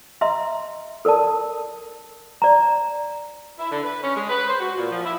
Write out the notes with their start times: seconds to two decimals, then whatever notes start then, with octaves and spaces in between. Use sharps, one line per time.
0.21 D#5 E5 A#5 C6
1.05 A4 A#4 D5 A5
2.42 D5 A#5
3.59 E4
3.71 D3
3.84 B4
4.02 C#4
4.16 G#3
4.29 B4
4.48 C5
4.60 F#4
4.77 A#2
4.90 F3
5.05 E4